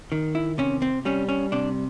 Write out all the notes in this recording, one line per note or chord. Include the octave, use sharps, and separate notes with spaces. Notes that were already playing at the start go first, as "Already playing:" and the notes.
D#3
E4
C3 C#4
C4
G3 C#4
C#4
C3 D4